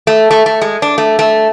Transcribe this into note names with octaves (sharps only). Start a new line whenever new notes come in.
A3
A3
A3
G#3
D4
A3
A3